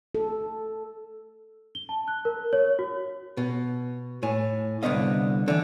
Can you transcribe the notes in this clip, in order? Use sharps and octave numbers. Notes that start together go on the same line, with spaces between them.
A4
G7
A5
F#6
A#4
C#5
F#4
B2
A2 G#5
C2 D3 G#3 B3 D#5 F5
D3 E3